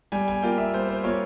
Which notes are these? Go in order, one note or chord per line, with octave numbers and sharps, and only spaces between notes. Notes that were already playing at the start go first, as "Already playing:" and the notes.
G3 G#5
G#5
A#3 F4 G5
E5
G3 C5
C5
A#3 F4 C#5